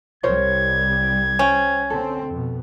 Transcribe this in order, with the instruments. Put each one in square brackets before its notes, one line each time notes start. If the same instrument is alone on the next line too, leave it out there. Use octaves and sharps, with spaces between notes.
[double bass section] C2 G3 [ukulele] A#4 C5 C#5 [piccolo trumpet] G#6
[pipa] C#4 [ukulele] C5 G5
[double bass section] D3 C4 [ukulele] A4
[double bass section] F2 B2